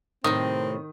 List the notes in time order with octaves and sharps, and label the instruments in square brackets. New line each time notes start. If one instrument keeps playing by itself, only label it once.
[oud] A2 C3 [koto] D#3 [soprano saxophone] C4 [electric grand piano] D#6